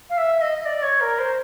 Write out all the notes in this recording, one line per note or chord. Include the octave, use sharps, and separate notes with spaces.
F5
E5
D#5
D5
C#5
A#4
C5